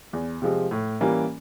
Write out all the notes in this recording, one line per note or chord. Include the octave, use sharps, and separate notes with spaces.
E2
C3 F3 G#3
A2
E3 G3 A#3 C#4